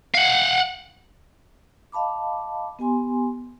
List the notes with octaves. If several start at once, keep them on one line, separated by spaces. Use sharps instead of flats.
F5 F#5
D#5 F5 A5 B5 D6
B3 G4 G#5 C6